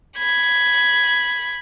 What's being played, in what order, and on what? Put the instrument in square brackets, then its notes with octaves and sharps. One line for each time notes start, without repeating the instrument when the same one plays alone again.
[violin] B5 G#6